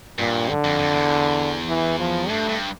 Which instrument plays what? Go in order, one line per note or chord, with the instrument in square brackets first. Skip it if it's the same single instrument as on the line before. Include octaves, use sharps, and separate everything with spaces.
[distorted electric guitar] G2 [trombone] A#2
[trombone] D3
[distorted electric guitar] F2
F2
E2
[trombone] E3
F3
[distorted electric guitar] G2 [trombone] A3
[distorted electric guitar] G2